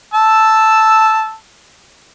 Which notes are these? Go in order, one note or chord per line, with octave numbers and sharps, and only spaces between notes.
A5 E6